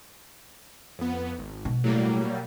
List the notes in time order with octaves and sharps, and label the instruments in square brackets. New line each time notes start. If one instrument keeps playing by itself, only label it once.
[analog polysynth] F2 B3
G#1
[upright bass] B2
[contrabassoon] A2 [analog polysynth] F#3 G3 A#3